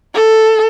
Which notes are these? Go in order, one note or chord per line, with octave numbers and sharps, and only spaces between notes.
A4